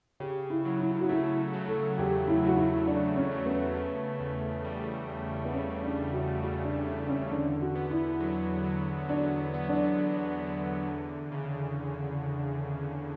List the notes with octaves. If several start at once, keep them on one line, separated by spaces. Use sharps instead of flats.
C#3 G4
E4
F#3
E4
F#4
A3 E4
F#3
A4
E2 G4
E4
F#3 F#4
E4
C#3 D4
C#4
A3
B3
C#3
E2
G3
E2
B3
C#3 C#4
D4
E2
F#4
C#3 F#4
D4
E2 C#4
D4
C#4
D3 D4
F#4
B3
E4
F#3
F#3
F#3 D4
B3
D4
F#3
D3
E2
C#3